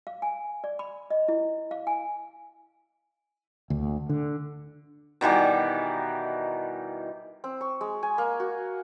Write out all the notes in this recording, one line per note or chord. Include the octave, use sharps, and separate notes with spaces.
F5
G#5
D5
B5
D#5
E4
F5
G#5
D2
D3
B2 D#3 E3 G3
C4
C#6
G#3
G#5
A#3
F#4